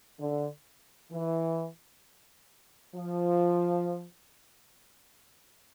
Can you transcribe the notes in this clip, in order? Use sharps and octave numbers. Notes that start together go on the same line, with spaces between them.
D3
E3
F3